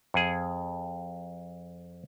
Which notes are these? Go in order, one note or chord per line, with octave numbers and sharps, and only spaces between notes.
F2 G#4